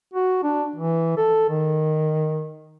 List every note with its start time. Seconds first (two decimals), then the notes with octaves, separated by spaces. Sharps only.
0.14 F#4
0.43 D4
0.76 E3
1.17 A4
1.49 D#3